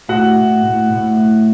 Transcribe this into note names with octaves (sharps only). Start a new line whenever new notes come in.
A2 F#4 F#5
A2
A2
A2
A2